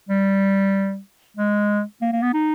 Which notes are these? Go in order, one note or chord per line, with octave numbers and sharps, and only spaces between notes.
G3
G#3
A#3
A#3
B3
D#4